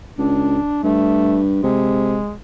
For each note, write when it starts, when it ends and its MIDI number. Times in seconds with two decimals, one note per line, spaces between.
0.18 0.58 37
0.18 0.81 62
0.84 1.59 43
0.84 1.40 57
1.63 2.18 48
1.63 2.33 56